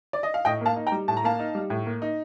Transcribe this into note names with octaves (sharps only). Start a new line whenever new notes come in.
D5
D#5
F5
A2 D#5 G5
A#3 F5 A5
D#4
G5 A#5
G3
A2 A5
A#5
A#3 F5 A5
D#4
G3
A2
A#3
D#4